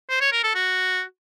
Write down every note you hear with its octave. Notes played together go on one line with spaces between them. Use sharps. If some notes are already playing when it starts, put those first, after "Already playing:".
C5
C#5
A#4
A4
F#4